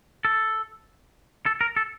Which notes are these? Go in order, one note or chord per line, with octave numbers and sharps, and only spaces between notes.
A4
A4
A#4
A4